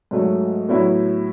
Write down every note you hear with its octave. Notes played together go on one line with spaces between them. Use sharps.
G#2 F#3 A3
A2 F#3 B3 E4